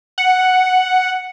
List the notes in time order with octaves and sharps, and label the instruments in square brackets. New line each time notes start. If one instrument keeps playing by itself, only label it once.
[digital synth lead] F#5